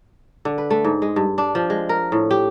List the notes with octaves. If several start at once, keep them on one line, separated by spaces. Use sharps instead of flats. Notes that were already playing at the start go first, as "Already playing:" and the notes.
D3
B4
A3
G#2
G#3
G2
D4
F3
G#3
A#4
A2
G4